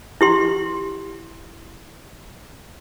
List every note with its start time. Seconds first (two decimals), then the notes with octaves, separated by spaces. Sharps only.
0.21 E4 G4 C6